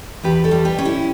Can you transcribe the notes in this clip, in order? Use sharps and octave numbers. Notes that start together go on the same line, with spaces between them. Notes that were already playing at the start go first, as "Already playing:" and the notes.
E2 G4 B4
A4 C#5
G3
G4 B4
C#4
E4